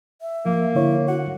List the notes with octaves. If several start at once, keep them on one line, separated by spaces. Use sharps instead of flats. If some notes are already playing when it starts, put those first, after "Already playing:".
E5
F3 A#3
D3 E4 C#5
F#4 F#5